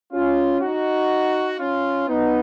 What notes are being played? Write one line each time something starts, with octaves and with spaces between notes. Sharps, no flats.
C#4 F4
D#4 F#4
C#4 F4
B3 D#4